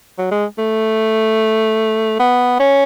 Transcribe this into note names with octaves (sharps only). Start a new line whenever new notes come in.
F#3
G#3
A3
B3
C#4